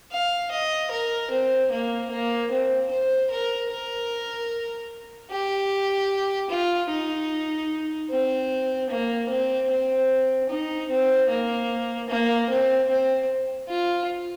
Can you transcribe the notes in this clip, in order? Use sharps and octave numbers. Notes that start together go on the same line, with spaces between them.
F5
D#5
A#4
C4
A#3
A#3
C4
C5
A#4
A#4
G4
F4
D#4
C4
A#3
C4
C4
D#4
C4
A#3
A#3
C4
C4
F4